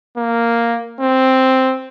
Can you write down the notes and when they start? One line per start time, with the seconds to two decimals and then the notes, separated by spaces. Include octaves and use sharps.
0.18 A#3
1.01 C4